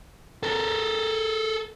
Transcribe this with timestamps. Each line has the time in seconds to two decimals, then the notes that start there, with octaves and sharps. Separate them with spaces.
0.43 A4 A#4